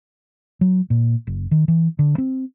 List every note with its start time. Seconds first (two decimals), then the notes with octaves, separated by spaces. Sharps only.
0.61 F#3
0.90 A#2
1.27 F#1
1.51 D#3
1.68 E3
1.99 D3
2.18 C4